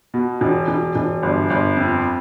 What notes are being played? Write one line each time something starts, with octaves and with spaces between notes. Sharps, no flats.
B2
E1
E1
E1
G1
G1
F2